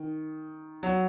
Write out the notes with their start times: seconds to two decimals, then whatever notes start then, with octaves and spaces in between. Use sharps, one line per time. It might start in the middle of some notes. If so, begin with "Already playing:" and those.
Already playing: D#3
0.83 F#3